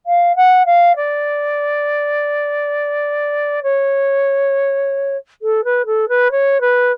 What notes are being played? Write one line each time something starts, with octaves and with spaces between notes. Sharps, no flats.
F5
F#5
F5
D5
C#5
A4
B4
A4
B4
C#5
B4